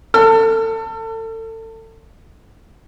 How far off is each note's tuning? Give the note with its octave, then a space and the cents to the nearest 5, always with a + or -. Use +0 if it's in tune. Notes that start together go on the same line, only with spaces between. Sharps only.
A4 +30 E6 +45